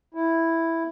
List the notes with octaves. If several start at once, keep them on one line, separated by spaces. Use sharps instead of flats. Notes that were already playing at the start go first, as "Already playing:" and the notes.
E4